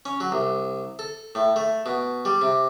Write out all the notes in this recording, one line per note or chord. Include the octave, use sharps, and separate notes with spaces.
C#4
F#3
C2
A4
A2
A3
B2
G3
C3